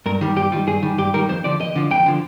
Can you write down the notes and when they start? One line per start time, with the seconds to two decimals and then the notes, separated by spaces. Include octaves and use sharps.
0.06 G2 A#4
0.21 D#3 G3
0.36 G2 G4
0.52 D#3 G3 F4
0.67 G2 G#4
0.83 D#3 G3
0.98 G2 G4
1.14 D#3 G3 A#4
1.29 F2 C5
1.44 D3 F3 D5
1.60 F2 D#5
1.76 D3 F3
1.91 F2 G5
2.06 D3 F3